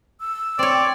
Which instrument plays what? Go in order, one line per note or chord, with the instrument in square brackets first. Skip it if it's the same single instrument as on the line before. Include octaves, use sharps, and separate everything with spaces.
[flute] E6
[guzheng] C4 C#5 [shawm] D5
[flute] G5